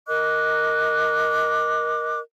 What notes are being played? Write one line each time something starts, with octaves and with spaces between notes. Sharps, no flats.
A#4 D#5 D6 F#6